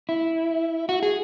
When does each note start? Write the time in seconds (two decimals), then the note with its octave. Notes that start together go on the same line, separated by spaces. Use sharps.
0.09 E4
0.89 F#4
1.03 G#4